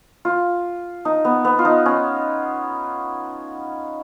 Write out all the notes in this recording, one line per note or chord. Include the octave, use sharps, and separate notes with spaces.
F4
D#4
B3
B3
F4
D#4
C#4